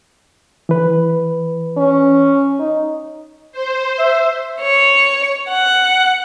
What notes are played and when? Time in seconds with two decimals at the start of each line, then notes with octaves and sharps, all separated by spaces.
0.69 E3 B4
1.77 C#4
2.59 D#4
3.52 C5
3.99 E5
4.61 C#5
5.50 F#5